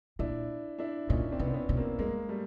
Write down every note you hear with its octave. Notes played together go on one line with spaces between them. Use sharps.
A#2 D4 E4
D4 E4
A#2 C#4 D#4
C4 D4
C3 B3
C4
B3 C#4
B2
A#3 C4
G2 G#3 A#3
G3 A3